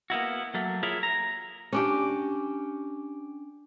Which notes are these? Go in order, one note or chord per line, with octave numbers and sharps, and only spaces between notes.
A#3 B3 E4 F#4
F#3 A3 A#3
E4 F4 G#4 A#4 C#5 E5
A#5
C#4 D4 G4